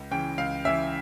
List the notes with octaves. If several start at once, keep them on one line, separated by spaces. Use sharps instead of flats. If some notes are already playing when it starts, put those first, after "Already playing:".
Already playing: C#2
C#3 E3 G5
C#2 F5
C#3 E3 E5